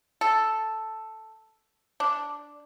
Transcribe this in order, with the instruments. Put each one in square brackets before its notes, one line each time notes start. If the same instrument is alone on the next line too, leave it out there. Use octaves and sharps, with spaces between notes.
[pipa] A4
D4